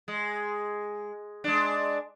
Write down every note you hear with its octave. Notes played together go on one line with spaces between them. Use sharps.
G#3
G#3 D4